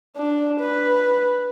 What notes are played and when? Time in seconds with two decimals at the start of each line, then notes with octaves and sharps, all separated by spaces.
0.17 D4
0.60 B4